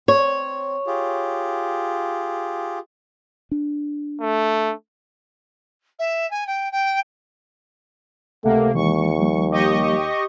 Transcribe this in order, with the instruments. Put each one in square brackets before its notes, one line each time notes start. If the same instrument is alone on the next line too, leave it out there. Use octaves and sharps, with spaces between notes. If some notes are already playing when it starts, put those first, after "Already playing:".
[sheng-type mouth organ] C4 [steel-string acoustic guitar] C#5
[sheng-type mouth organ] F4 G4 G#4
[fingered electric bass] D4
[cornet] A3
[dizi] E5
G#5
G5
G5
[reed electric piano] C#2 F#5 [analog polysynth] C3 A#3 [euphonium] A3
[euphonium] D#2 [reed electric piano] E3 G#3 [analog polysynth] C#6
[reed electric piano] F3 G3 A#3
[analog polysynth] G4 D#5 C#6